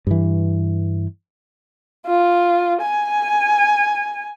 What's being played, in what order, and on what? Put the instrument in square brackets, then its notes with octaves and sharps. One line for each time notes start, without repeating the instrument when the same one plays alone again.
[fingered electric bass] G2 E3
[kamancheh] F4
G#5